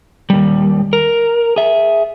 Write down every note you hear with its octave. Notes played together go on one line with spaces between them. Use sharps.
D#2 G3
A#4
G#4 E5